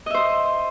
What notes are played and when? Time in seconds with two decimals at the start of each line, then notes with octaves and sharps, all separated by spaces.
0.06 D#5
0.10 E5
0.14 C5